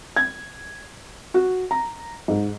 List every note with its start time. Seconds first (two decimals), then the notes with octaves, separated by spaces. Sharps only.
0.16 G#6
1.34 F#4
1.71 A#5
2.28 G#2